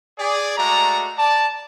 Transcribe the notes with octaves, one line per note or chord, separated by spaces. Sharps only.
G#4 D5
G#3 A3 F#4 D5 A#5
D5 A5